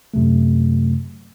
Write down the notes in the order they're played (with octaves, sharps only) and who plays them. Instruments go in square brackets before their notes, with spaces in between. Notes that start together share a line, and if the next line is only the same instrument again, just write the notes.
[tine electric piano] F#2 C3 F#3 A3